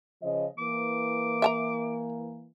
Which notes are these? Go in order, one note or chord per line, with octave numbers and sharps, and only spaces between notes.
C#3 F3 D#5
E3 A#3 D6
E5 A5 A#5